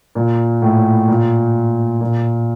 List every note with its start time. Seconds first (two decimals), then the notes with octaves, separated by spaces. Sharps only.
0.15 A#2
0.62 A2
1.08 A#2
2.01 A#2